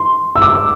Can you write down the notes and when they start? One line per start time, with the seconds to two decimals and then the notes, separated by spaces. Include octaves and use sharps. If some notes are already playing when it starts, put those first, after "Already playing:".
Already playing: C6
0.36 E6
0.42 D6